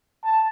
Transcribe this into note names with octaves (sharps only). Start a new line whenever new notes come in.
A5